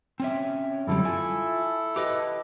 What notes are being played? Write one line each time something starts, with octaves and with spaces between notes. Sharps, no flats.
C4 C#4 E5
F#2 D3 G3 E4 A4
F4 E5 G#5
G4 B4 D#5